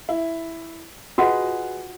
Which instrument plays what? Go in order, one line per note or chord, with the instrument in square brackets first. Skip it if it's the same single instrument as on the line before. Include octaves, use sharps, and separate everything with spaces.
[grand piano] E4
[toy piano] F4 F#4 F#5 [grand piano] G#4 B4 D#5